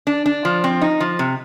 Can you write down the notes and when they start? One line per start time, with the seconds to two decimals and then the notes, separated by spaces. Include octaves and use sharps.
0.07 D4
0.26 D4
0.45 F3
0.64 C4
0.82 D#4
1.00 F3
1.19 C3